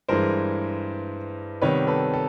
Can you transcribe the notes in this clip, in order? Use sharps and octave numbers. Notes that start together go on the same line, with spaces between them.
G2 E3 G#3 A#4 C5
C3 D#3 G3 B3 B4 C#5
A4 B4
A4